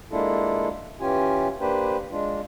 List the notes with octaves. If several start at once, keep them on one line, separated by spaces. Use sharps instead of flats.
G#3 A#3 D4 E4 F4 A4
E3 C#4 F4 G4 G#5
A#3 D4 G4 B4 C5
G#3 D4 F4